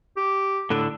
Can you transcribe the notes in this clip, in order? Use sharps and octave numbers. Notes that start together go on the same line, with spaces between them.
G4
A2 D3 D4 A4